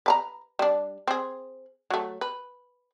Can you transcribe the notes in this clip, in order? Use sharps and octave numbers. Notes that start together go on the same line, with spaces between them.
B4 A5 A#5
G3 D4
C4 G#4
F#3 A3
B4